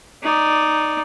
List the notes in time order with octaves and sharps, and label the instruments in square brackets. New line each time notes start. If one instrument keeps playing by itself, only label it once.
[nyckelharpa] D#4 D5